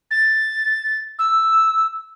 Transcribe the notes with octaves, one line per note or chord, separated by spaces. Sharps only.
A6
E6